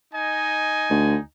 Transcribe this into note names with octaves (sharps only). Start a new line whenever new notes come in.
D#4 D#5 G#5
D2